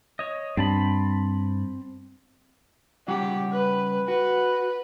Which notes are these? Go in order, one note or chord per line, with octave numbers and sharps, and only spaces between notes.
C#5 D#5
G2 C4 A5 B5
C#3 G3 G4 F#5
B4
F#4 B4